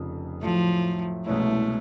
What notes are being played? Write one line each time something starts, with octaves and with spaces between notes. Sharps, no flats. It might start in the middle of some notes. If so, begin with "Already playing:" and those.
Already playing: F1 F2 C#3 F3
A2 F3 F#3 A3
C2 B2 G#3 A3 C#4 E4